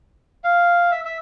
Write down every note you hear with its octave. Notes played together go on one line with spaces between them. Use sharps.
F5
E5
E5